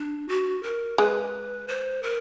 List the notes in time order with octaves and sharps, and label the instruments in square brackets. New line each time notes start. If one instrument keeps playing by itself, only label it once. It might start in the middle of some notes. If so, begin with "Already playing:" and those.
Already playing: [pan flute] D4
F#4
A#4
[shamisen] G#3 [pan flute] B4
[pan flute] C5
A#4